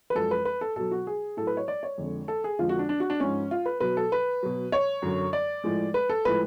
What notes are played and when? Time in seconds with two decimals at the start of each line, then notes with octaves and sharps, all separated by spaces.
0.10 B4
0.15 F#2 F3 G#3 A4
0.31 B4
0.45 B4
0.61 A4
0.76 B2 F#3 A4
0.91 F#4
1.07 G#4
1.37 A2 F#3 A4
1.47 B4
1.57 C#5
1.68 D5
1.83 C#5
1.98 F2 D3 G#3
2.28 A4
2.44 G#4
2.59 F2 D3 F3 G#3 F4
2.69 F#4
2.79 D4
2.89 D4
3.00 F#4
3.10 D4
3.20 G#2 F3 G#3 C#4
3.51 F4
3.66 B4
3.80 B2 F#3 B4
3.97 A4
4.12 B4
4.43 B2 F#3
4.72 C#5
5.02 F#2 D3 F#3
5.33 D5
5.64 A2 F3 G#3
5.94 B4
6.09 A4
6.25 A2 F3 G#3 B4